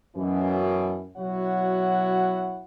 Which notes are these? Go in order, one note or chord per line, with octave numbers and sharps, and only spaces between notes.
F#2 B2 E3
B2 F#3 E4 F#4 C#5 F#5